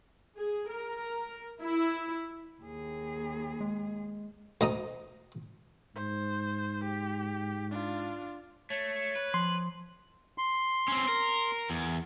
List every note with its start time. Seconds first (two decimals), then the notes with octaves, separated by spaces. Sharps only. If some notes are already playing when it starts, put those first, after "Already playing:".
0.38 G#4
0.71 A#4
1.63 E4
2.62 D#2 G#4
3.61 G#3
4.61 D2 D#5 A#5 D#6
5.96 G#2 C5
6.84 G4
7.71 D4 F4
8.70 A3 C#5
9.16 B4
9.34 F3 C6
10.38 C6
10.88 C4 C#4
11.09 A#4
11.70 E2